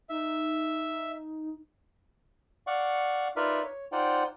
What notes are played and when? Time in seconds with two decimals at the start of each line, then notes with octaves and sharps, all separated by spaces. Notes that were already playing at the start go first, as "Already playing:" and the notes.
0.09 D#4 E5
2.67 D5 F5 F#5 C#6
3.36 D#4 F4 A#4 B4 D5 E5
3.63 C#5
3.92 D#4 F4 C5 D5 F#5 G5